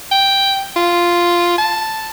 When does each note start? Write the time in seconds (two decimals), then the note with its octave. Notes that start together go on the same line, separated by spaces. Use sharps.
0.11 G5
0.76 F4
1.58 A5